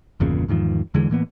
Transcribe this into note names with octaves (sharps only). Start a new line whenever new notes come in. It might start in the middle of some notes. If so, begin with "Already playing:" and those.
G1 E2 A#2 C#3
E2 G#2 D#3 F3
E2 D3 E3 G#3
A2 E3 A#3 B3